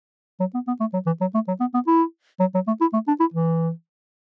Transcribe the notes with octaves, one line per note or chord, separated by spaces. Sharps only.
F#3
B3
B3
A3
F#3
E3
F#3
A3
F#3
B3
B3
E4
F#3
F#3
A3
E4
A3
D4
E4
E3